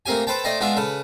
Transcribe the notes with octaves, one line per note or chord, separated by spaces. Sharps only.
A3 A#3 C4 G4 G#5
A4 B4 C5 G5 A5
A3 C5 D5 D#5 G5
G#3 B3 D4 F4 D5 E5
C#3 A4 B4